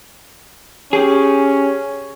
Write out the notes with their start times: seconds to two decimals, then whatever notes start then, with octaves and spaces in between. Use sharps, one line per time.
0.93 C#4 G4 G#4